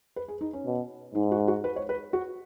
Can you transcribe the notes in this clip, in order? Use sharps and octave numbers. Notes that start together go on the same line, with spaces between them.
B4
G#4
D#4
C#4
B2
G#2 D#4
F#4
F#4
B4
C#5
B4
F#4